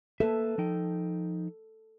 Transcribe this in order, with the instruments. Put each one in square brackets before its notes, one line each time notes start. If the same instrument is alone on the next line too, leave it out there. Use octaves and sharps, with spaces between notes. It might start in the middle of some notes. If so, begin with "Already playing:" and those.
[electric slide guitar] A#3 B4 E5 [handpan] A4
[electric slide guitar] F3 D#4 G5